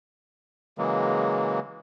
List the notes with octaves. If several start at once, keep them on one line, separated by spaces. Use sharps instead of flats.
C#3 E3 F#3 G#3 A#3